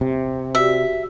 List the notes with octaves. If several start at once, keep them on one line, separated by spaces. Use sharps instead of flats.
C3
F#4 G4 D5 E5